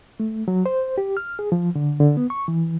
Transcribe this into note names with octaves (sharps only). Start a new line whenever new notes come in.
A3
F#3
C5
G4
F6
G#4
F3
D3
D3
B3
C#6
E3